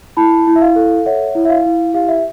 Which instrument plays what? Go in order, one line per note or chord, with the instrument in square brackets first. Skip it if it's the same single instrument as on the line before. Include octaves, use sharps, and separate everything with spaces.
[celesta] E4 A5 B5
E4
E5
F5
A4
C#5 E5 F#5
E4
E5
F5
E4
G4 F5
E5